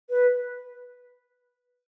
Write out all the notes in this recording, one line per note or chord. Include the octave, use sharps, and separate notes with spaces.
B4